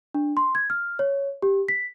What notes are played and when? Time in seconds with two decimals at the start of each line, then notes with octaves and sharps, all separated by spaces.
0.14 D4
0.37 C6
0.55 G#6
0.70 F6
0.99 C#5
1.42 G4
1.68 B6